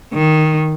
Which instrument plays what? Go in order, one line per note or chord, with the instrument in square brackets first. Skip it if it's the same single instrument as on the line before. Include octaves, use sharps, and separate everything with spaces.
[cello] D#3